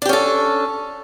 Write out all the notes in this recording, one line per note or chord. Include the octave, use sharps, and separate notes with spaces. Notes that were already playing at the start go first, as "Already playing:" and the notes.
C#4 D4 G4 A4